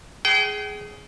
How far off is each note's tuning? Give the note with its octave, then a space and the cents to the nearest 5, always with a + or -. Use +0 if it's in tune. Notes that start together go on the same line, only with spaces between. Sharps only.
G#4 +5 G5 -35